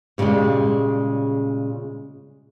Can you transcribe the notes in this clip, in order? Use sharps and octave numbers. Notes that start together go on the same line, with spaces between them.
A#2 C#3 F3 G3 G#3